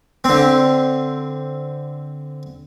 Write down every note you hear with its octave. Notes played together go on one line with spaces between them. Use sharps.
D3 C4